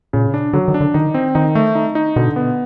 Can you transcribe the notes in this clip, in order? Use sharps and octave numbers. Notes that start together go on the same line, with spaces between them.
A#2 C#3
D4
D3 F#3
D#3
D4
D3
D#3 D#4
C4
D#3 D#4
A3
D#4
D#4
B2 D3
B3